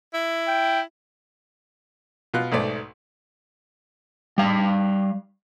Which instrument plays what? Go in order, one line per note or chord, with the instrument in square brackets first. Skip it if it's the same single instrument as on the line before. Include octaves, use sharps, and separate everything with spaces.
[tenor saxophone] E4
[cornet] G5
[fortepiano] B2 F4 F#6
B1 G#2 A3 D5
[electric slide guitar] G3 F5